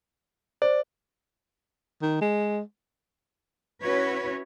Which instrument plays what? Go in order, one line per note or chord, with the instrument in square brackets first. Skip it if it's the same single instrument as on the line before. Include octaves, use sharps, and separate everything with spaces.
[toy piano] C5 [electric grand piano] D5
[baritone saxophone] D#3
G#3
[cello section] C#4 E4 F#4 B4 C#5